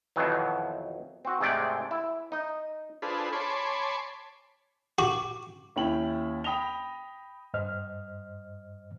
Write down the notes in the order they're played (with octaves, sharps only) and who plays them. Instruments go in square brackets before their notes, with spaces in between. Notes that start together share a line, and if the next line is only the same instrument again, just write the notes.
[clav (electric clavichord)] F2 B2 D#3 E3 F#3
C4 F#4
G#2 C3 G#3 A3 D5 G5
E4
D#4 D#5
[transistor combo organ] D4 F4 G#4 A4 B4 C5
C#5 G#5 A5 B5 C6 D6
[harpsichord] F#4 [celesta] D6
[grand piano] D#2 C#4 E4 G5 F#7
G5 B5 D#6 A#6 F7 G7
[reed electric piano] G2 C5 D#5 F6